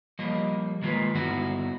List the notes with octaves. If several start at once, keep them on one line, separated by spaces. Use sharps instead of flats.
F3 G3 A#3 D#5
D#3 G#3 A#3 F4 B4
G2 D3 B3 D#4 E4 F#4